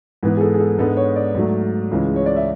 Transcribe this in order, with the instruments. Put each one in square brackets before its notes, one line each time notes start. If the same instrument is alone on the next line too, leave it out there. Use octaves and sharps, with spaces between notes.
[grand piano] G#2 E3 B3
G#4
A4
G#4
A4
G#2 G#3 B3 D4 A4
C#5
D5
G#2 F#3 A3
C#2 C#3 E3 G#3
C#5
D5
E5